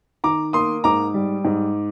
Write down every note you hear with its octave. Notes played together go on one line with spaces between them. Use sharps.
D#3 A#5 D6
A#3 C6 D#6
G#2 A#5 D6
G3
G#2